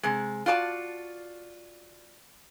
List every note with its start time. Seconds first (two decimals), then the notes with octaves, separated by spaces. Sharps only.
0.03 C3 G#3
0.46 F4 F#4 D5 A5